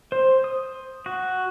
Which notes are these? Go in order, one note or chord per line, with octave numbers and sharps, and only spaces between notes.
C5
D#6
F#4